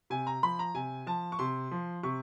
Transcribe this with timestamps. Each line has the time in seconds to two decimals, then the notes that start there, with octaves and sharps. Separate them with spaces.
0.10 C3 G#5
0.27 A#5
0.43 F3 B5
0.59 A#5
0.75 C3 G#5
1.06 F3 A5
1.32 C#6
1.39 C3 C6
1.71 F3
2.03 C3 C#6